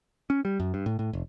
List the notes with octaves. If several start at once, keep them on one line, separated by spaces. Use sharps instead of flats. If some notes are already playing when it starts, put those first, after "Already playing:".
C#4
G3
F#2
G2
A2
A2
F1